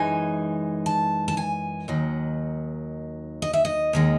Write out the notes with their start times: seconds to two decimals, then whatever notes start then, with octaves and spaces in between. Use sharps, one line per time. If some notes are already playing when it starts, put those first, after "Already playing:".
Already playing: F#2 E3 G#3 D#4 G#5
0.86 A5
1.28 A5
1.37 G#5
1.88 D#2 D#3 F#3
3.42 D#5
3.53 E5
3.65 D#5
3.93 D#2 D#3 G#3